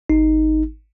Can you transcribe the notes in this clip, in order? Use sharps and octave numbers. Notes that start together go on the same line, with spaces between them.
G#1 D#4